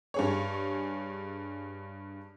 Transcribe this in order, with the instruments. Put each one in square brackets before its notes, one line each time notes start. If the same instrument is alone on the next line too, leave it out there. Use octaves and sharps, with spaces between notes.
[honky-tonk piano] G2 G#4 C#5